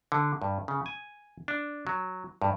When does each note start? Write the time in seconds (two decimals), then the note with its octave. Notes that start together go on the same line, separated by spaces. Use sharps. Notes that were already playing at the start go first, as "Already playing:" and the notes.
0.12 D3
0.42 G2
0.68 C#3
0.86 G#5
1.48 D4
1.87 F#3
2.42 G2